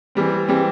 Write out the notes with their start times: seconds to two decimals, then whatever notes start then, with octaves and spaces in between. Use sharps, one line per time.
0.15 E3 G3 C4
0.48 E3 G3 C4